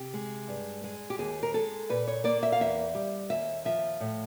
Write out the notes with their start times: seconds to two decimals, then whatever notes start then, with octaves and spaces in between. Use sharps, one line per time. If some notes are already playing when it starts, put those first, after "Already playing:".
Already playing: C3 G4
0.14 G#3
0.48 G2
0.84 G#3
1.10 G4
1.18 D#2 G#4
1.43 A#4
1.54 G#3 A4
1.89 A#2 B4
2.07 C#5
2.24 A#3 D5
2.43 E5
2.52 F5
2.60 E2 E5
2.95 G3
3.30 D#2 E5
3.65 F3 E5
4.00 A2